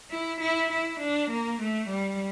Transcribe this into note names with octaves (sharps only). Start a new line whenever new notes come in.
E4
E4
E4
D4
A#3
A3
G3